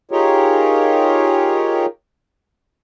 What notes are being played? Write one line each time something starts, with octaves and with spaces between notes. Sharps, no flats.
D#4 F4 G4 G#4 A#4 C#5